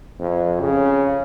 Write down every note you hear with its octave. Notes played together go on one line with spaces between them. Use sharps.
F2
C#3